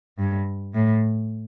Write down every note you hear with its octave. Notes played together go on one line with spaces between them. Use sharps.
G2
A2